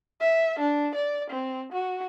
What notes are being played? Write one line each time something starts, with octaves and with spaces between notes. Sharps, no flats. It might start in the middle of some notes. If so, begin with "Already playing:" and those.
E5
D4
D5
C4
F#4